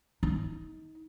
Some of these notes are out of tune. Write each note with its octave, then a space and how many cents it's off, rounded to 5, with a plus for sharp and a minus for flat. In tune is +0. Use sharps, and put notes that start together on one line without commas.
D#4 +25